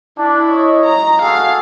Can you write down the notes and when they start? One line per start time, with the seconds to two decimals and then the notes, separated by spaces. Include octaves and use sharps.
0.19 D4 E4
0.48 C#5 D#5
0.85 A#5
1.22 F#4 G#4 A4 F5